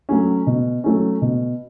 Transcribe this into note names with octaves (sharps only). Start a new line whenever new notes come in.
F#3 A3 C#4
B2
F#3 A3 C#4
B2